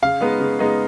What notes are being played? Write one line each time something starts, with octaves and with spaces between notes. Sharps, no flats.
C#3 F5
G#3 B3 D#4
C#3
G#3 B3 D#4